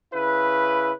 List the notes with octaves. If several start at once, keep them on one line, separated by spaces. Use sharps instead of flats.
C#3 E4 B4